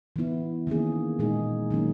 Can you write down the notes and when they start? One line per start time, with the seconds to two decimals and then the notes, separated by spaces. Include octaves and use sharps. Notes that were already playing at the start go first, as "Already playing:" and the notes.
0.16 E3 B3 E4
0.67 D#3 A#3 C#4 G#4
1.19 A#2 G#3 D#4 G#4
1.70 D#3 F#3 A#3 C#4